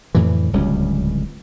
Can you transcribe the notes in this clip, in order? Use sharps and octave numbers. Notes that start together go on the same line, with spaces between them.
F2 A2 D3 E3
D1 C#2 G3 C#4